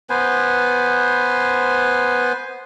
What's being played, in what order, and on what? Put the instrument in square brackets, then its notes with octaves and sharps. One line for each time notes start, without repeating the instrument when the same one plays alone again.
[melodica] B3 B4 C5 G#5